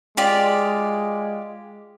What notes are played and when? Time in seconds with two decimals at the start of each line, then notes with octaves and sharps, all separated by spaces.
0.17 G#3 F4 G4 D5